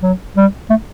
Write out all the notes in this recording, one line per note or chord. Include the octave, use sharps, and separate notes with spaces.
F#3
G3
A3